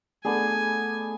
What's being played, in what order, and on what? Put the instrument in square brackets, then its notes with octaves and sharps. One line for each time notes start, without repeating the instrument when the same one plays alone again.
[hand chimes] A3 A4 [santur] B3 D4 G#4 [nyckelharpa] G#5